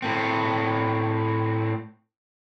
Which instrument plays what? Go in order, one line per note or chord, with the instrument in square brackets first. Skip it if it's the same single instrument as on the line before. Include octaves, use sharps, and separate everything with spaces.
[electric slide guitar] A2 C4